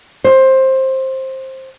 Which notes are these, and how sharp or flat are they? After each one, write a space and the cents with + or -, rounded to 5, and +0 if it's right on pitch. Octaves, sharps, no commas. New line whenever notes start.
C5 +15